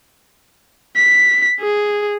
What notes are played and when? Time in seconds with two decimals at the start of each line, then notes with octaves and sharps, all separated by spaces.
0.96 B6
1.60 G#4